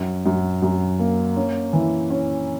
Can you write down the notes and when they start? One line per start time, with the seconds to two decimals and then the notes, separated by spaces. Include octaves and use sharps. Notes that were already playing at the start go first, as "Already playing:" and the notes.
Already playing: F#2
0.26 F#2
0.62 F#2
0.99 A#3
1.36 C#4
1.73 E3
2.10 C#4